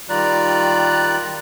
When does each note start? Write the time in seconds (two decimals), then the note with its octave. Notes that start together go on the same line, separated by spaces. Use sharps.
0.09 D#3 G3 F4 D5 A#5 F#6